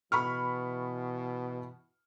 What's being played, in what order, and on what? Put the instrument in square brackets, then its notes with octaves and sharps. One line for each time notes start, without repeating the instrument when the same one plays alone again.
[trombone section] B2 E3 [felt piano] B5 C#6 F6